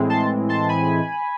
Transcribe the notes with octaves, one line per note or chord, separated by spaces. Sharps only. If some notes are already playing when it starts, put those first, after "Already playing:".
Already playing: A2 E3 G#3 C4 E4
A5 C6
A5 C6
G#5 B5